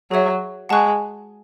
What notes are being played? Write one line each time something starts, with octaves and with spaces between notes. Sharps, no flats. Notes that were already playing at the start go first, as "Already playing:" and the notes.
F#3 G#4 C#5 E5
G#3 F#5 A5 C#6 F#6